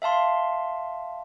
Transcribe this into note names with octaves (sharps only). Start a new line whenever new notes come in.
E5 F5 A5 C6